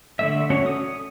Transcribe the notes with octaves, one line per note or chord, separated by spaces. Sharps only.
D3 A3 E5
A3 C#4 F#4 C#5
D#6